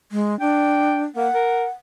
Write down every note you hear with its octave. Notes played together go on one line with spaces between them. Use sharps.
G#3
D4 G5
A#3 F#5
A#4